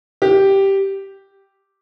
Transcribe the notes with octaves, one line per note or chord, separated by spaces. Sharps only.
G4